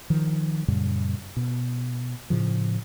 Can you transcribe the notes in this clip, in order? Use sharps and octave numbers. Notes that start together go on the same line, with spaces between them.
D#3 F3
F#2 A#2 C#3 G3
B2
A2 C#3 F3